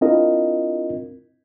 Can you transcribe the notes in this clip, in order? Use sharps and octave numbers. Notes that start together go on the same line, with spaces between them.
C4 D4 E4 F4 A#4 D#5